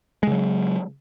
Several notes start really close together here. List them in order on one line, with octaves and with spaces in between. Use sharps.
G#3 C#3 F#3